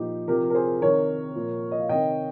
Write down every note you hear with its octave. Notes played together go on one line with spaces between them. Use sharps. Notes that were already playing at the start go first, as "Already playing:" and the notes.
Already playing: A#2 F3 D#4 G4
C3 F3 G4 A#4
A#4
G#4 C5
C3 D#3 A#4 C#5
A#2 F3
D#5
F5
C3 D#3 D#5 G5